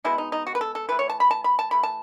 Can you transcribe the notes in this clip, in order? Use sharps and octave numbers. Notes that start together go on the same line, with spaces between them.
B2 G#3 B3 E4
D#4
D#4
F#4
B4
A4
A4
E3 A3 B4
C#5
A5
B5
A5
B5
A5
E3 A3 B5
A5